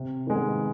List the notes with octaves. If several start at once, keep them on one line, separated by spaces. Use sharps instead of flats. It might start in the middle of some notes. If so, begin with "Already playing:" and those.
Already playing: C3
D#3 G#3 B3